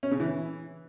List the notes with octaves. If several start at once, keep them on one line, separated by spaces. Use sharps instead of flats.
C#4
C#3
E3